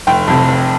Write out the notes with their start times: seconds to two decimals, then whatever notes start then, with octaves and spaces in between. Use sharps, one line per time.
0.07 F1 G5
0.27 F2 C3
0.48 F1